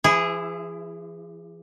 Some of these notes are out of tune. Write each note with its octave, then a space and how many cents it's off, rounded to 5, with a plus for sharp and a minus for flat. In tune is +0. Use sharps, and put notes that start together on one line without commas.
E3 +45 E4 +10 G#4 -15